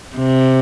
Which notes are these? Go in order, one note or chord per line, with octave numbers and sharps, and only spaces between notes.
C3